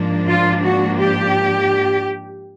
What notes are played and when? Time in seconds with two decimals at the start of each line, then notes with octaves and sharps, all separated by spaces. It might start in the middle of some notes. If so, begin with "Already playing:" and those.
Already playing: G#2 F3 A#3 D4
0.28 F4
0.64 F#4
1.00 G4